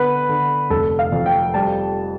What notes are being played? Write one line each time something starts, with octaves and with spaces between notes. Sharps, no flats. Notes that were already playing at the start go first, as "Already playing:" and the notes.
Already playing: D3 B3 B4
D3
F1 A4
F5
F2
G5
G3 A5